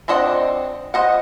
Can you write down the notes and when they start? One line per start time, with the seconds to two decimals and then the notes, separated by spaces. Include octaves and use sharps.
0.08 C4 D4 C5 D#5 F#5
0.94 C5 D#5 F#5